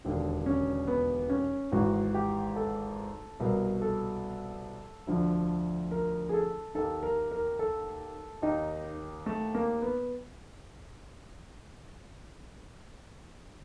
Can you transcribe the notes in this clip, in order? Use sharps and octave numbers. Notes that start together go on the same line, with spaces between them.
E1 D#2 D3
C#4
B3
C#4
G#1 G#2 E3 F#4
G4
A4
C2 B2 A#4
A4
D2 D3 F3
A#4
G#4
A4
D#2 D#3 A4
A#4
A#4
A4
D#2 D#3 D#4
A3
A#3
B3